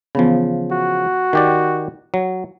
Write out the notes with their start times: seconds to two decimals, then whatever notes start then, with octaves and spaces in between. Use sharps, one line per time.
0.15 C#3 E3 F3 B3 B5
0.72 F#4
1.33 D#3 G4 D5
2.14 F#3